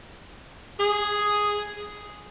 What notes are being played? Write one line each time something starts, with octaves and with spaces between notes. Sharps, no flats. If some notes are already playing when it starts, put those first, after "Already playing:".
G#4